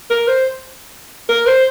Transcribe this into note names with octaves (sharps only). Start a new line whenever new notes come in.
A#4
C5
A#4
C5